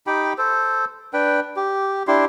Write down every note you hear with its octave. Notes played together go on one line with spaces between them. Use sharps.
D#4 G4 G5 B5
A4 C5
D4 B4 G5
G4
D4 E4 G4 C6